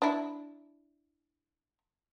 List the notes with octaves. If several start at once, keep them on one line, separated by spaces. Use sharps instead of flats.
D4 E4